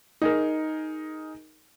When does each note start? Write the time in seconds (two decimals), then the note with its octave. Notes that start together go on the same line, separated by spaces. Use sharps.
0.22 D#4 G#4 A#4